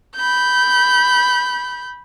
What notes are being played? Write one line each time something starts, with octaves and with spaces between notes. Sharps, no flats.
B5 G6